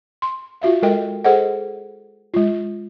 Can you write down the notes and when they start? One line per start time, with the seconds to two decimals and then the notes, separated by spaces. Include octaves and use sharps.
0.22 C6
0.61 F4 F#4 E5 F5
0.82 G#3 A4 A#4 D#5 G5
1.24 G#4 A4 C5 D#5 F#5
2.34 G#3 F4